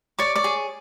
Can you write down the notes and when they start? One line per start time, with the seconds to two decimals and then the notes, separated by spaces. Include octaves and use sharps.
0.19 C#5 D5 D6
0.36 D5 D6
0.44 G#4